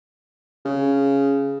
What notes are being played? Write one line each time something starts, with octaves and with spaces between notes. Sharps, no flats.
C#3